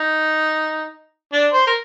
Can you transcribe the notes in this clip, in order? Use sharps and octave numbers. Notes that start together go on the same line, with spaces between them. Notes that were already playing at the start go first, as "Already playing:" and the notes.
Already playing: D#4
D4
C5
A#4